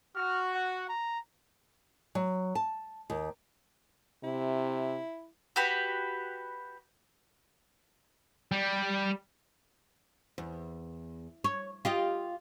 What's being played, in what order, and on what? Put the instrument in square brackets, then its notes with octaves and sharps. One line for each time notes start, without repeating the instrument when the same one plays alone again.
[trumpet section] F#4 [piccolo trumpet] F6
[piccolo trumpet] F#5
A#5
[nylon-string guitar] F#3
A5
D#2
[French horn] C3 [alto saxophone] E4
[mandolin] F#4 G4 B4
[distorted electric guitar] G3
[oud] E2
C#5
F4 G4 D#5